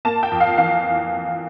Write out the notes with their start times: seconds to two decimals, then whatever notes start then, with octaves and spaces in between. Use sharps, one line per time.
0.05 A#3 A5
0.23 G5
0.31 F2
0.40 F5
0.57 E3 F5